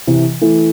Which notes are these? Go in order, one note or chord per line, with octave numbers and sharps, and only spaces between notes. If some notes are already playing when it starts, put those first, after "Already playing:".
C3 E3
E3 A3